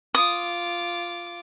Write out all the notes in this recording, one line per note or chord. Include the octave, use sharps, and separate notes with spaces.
F4 D6 D#6